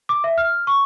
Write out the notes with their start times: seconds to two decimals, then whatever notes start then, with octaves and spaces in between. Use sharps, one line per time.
0.09 D6
0.24 E5
0.38 F6
0.67 C#6